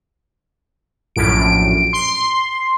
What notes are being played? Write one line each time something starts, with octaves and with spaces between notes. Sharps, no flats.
A#1 F#2 A2 D7
C6